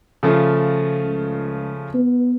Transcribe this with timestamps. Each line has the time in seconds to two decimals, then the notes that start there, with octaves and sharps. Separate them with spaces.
0.23 C#3 F3 A3
1.02 C#2
1.94 B3